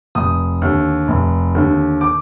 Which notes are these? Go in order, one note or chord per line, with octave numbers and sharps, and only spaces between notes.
F1 D#6
D#2 D3
F1
D#2 D3
D6